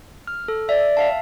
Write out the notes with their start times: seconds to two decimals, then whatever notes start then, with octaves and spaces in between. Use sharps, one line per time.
0.27 F6
0.48 A4
0.69 D5 E5
0.97 E5 F5 A5